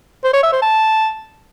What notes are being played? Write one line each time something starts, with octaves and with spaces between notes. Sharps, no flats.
C5
C#5
E5
C5
A5